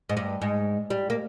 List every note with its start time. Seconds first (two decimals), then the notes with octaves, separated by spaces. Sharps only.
0.09 G#2
0.17 G2
0.42 G#2
0.90 G3
1.10 A#3